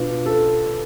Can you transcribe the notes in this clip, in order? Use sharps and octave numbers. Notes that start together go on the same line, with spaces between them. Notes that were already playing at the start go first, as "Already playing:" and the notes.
Already playing: B2 D4 F4 B4
A4